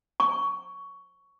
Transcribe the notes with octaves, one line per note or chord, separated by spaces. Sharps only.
C#6